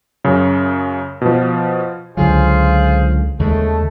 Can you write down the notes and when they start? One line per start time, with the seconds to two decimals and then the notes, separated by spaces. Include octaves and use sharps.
0.25 F#2 C#3
1.21 B2 F3
2.17 C#2 D3 F#3 F4 G#4 C5
3.39 D#2 C#3 G#3 A3